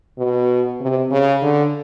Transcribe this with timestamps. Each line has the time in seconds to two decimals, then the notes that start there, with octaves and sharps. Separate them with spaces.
0.18 B2
0.81 C3
1.11 C#3
1.43 D3